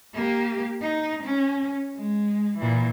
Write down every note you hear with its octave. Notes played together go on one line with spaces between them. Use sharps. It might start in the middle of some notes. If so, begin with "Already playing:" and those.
A#3 G4
D#4
C#4
G#3
A#2 E3